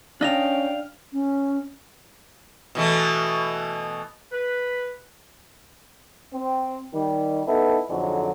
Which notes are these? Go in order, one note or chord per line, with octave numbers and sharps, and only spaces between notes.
C#4 D4 D#5 F5 G5 F6 F7
C#4
B2 E3 A3
B4
C4
D#3 G3
B3 D#4 E4 A4
F2 G#2 D3 F#3